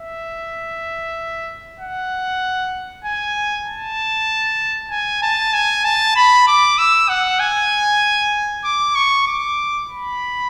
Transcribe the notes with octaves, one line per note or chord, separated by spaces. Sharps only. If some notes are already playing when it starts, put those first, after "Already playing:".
Already playing: E5
F#5
G#5
A5
G#5
A5
G#5
A5
B5
D6
E6
F#5
G#5
D6
C#6
D6
B5